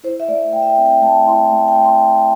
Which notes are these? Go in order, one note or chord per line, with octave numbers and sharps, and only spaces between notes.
E4 C5
E5
A3 D5
A3 G5
E5
G5
C4
G5
A3 A5
E4 C6
A3
G5
A3
C6